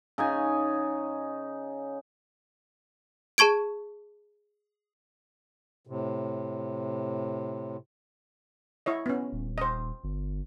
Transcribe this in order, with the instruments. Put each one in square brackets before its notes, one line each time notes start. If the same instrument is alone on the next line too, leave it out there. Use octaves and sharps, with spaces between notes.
[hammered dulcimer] C#3 D#4 G#5
[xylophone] G#4 A5 C#6 G#6 D7
[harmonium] A2 C3
[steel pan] E4 C#5 D#5
B3 C#4
[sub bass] D#1
[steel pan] C5 D#5
[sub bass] G1